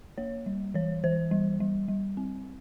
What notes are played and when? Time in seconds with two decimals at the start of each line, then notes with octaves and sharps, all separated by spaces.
0.18 A#3 C#5
0.46 G3
0.74 E3 C#5
1.04 E3 C5
1.31 G3
1.60 G3
1.88 G3
2.17 C4